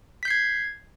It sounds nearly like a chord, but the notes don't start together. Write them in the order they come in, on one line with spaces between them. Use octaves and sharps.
B6 G6 C7 G#6